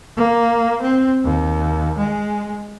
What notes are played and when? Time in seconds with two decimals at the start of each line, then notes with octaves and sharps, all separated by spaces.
0.17 A#3
0.82 C4
1.24 D#2
1.98 G#3